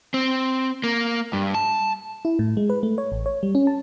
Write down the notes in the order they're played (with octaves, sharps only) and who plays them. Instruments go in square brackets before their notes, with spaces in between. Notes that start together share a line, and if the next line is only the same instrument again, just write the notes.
[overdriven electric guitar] C4
A#3
G2
A5
[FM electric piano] E4
A2
G#3
B4
A3
C#5
A1
C#5
G3
C#4
A5